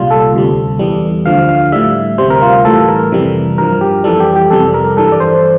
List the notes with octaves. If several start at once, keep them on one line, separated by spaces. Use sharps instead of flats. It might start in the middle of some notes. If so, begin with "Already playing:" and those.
Already playing: C2 A#2 G3 F4
A4
D2 C3 G3
E2 E3 G3
D2 D3 F3 F5
F5
A2 G3 E5
D2 C3 G3 C5
A#4
F4
F4
A2 E3 G3 A4
A#4
F2 C3 E3 G3
G2 F3 A#4
G4
F2 E3 G3 A4
G4
G4
F2 C3 G3 A4
A#4
G2 E3 G3 A4
D5
C5